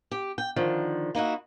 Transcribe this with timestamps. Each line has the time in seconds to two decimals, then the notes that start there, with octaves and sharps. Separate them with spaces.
0.11 G4
0.38 G5
0.56 D3 D#3 F3
1.15 A#3 D#4 E4 F#4